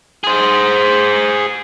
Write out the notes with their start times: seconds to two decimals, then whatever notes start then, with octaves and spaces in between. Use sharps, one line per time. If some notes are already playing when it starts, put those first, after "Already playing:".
0.24 G#4 C5